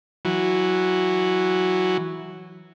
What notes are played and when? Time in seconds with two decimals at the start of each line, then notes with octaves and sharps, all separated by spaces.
0.25 E3 F#3